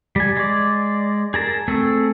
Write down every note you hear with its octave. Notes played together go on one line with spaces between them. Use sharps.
G3 G#5
G#3 D5
G#4 A#4 A5
A3 C4 G#4 A4